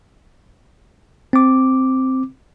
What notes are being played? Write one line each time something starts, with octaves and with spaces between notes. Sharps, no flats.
C4 D6